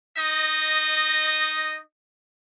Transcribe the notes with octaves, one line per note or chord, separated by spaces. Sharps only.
D#4 D#5